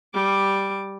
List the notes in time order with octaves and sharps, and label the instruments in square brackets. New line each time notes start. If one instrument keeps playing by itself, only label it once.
[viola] G3 D6